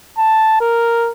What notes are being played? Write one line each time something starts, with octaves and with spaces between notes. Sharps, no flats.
A5
A#4